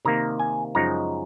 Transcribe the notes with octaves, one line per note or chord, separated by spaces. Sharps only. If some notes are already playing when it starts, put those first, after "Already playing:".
C3 D#3 A#3 A#5
G#5
F#2 C#3 F3 G#3 D#4 A#5